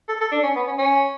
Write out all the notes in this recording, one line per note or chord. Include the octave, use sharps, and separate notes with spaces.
A4
A4
D4
C#4
B3
C#4
C#4